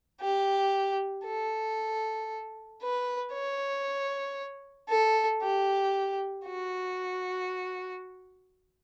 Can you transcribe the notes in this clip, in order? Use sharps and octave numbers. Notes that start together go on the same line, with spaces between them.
G4
A4
B4
C#5
A4
G4
F#4